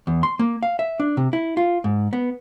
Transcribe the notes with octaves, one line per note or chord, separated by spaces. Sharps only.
E2
C6
A#3
F5
E5
D4
C3
E4
F4
G#2
B3